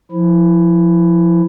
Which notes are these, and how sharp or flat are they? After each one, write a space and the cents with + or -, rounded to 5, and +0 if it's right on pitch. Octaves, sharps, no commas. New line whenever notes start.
F3 +0 E4 +5